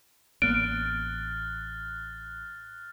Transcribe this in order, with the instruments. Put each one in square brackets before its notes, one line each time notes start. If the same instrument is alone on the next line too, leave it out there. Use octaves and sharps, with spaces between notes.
[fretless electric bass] A1 A#3 B3 [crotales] F6 F#6 A6 [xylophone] D7